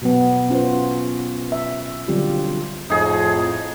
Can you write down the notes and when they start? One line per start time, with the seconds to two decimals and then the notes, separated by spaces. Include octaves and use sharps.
0.02 B2 F#3 B3
0.50 C#4 F4 B4 C5
1.52 E5
2.08 D3 F#3 G3 C4 F4 G4
2.90 F2 A2 D#4 G#4